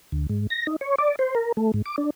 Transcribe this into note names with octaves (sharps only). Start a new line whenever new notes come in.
D2
G#2
A#6
D#4
C#5
D5
C5
A#4
A3
G#2
D6
D4